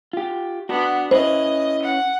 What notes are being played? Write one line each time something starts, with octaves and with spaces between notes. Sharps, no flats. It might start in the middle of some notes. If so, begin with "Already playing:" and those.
F4 G4
B3 D4 F#4
C#4 E4 B4 C5 D#5
F#5